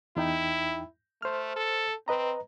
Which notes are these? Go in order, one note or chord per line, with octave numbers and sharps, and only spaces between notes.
E2 D#4 E4 G5
A3 C5 F6
A4
C4 B4 D#5 A#5